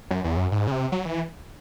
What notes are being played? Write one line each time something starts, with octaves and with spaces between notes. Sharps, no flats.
F#2
E2
F#2
G#2
C#3
C3
F#3
E3